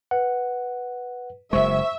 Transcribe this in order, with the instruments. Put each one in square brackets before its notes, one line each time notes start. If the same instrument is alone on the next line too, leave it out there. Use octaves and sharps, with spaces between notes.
[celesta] B4 [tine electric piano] F#5
[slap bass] F#1 G#3 [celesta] C5 [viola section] E5 [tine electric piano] C#6